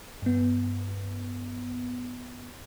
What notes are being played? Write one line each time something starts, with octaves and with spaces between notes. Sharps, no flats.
G2 B3